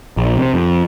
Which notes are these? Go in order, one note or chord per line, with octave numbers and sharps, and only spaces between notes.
A#1
C3
F2